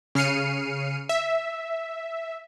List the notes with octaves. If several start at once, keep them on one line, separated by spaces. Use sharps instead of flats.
C#3 F6 C7 C#7 D#7
E5